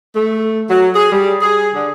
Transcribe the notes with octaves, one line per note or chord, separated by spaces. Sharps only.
A3
F#3
G#4
G3
G#4
D3